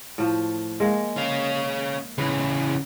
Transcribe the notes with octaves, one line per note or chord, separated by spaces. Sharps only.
A2 F3
G#3 A#3
C#4 F5
C#3 E3 B4